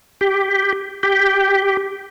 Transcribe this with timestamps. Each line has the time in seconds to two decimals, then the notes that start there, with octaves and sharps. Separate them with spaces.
0.21 G4
1.03 G4